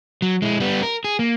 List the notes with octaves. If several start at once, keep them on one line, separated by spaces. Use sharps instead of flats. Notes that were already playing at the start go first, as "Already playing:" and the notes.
F#3
G#3 E4
G3 B3
A#4
G#4
A#3